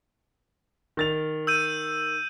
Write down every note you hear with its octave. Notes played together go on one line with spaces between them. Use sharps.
D#3 A6 F7
E6 G6 D#7